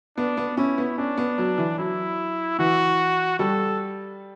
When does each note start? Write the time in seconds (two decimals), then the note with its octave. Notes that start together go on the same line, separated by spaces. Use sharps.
0.17 B3 D4
0.37 B3
0.57 C#4 E4
0.78 B3
0.98 C#4 D4
1.18 B3
1.38 F#3
1.58 E3
1.78 F#3 E4
2.59 E3 F#4
3.39 G3 A4